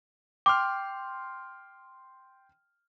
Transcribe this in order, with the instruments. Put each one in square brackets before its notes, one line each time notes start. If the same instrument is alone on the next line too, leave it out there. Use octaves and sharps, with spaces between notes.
[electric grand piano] G5 C6 F6 [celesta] D6